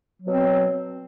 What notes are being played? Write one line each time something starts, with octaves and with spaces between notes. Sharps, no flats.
B2 F#3 C4